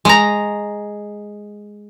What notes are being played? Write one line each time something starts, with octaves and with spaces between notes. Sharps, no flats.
G#3 A#5